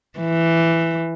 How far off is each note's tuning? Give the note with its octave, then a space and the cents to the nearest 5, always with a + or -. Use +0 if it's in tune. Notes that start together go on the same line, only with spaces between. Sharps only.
E3 +5